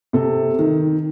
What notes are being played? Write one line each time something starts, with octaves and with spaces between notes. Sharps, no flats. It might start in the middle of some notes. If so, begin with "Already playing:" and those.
C3 A4
D#3